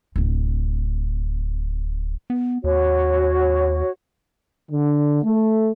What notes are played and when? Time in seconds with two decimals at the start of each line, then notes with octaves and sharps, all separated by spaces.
0.16 D1 C3
2.30 B3
2.64 D#2 F#4 C#5
4.71 D3
5.22 A3